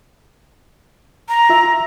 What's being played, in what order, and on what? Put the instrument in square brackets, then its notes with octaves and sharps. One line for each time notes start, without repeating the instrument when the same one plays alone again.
[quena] A#5
[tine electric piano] F4 E5